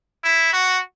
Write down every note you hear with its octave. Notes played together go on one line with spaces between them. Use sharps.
E4
F#4